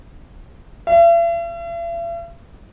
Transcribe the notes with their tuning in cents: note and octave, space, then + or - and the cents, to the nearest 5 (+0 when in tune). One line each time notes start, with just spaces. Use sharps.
E5 +45